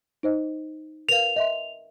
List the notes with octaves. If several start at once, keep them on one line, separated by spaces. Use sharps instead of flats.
D#4 C5 D#5
A#4 B4 F5 F7
D#5 E5 C6